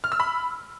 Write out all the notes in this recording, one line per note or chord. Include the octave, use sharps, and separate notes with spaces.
F6
E6
B5